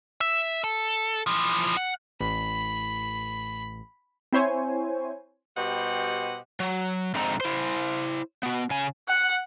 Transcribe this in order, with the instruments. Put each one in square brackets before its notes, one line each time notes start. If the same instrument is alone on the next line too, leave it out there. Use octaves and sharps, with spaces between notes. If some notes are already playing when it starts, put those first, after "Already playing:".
[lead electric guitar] E5
A4
E3 F3
F#5
[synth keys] A1 [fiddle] B5
[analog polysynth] C4 E4 C5 C#5 G#5
[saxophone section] B2 G3 G4 C5 D#5 F#5
[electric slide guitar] F#3
F2 G#2 D3 C4 D#4 A#5
E4 C5
B3 F#4
C#3 G#5
[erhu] F#5